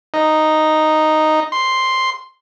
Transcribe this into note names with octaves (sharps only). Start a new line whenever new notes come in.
D#4
C6